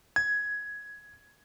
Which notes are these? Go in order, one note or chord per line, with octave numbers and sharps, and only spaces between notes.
G#6